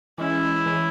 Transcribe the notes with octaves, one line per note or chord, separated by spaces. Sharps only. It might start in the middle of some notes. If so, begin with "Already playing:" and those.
E3 G#3 C#4 E4
E3 G#3 C#4